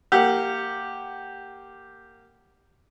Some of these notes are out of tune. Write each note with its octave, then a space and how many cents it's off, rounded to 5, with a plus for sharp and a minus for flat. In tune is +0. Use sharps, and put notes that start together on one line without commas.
A#3 -15 G4 +0 F#5 +0